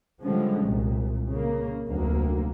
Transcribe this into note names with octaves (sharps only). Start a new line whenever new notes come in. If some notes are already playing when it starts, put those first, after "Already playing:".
D3 F3 G3 G#3 C#4
C2 A#2
C#3 A#3
F1 D2 D3 F#3 A#3